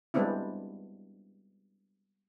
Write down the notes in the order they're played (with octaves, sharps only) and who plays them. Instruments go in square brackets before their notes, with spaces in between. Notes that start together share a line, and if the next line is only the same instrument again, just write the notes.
[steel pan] G3 G#3 B3 C4 D4 E4